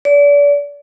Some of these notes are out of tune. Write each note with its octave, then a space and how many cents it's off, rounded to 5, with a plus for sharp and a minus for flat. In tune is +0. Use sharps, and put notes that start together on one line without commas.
D5 -35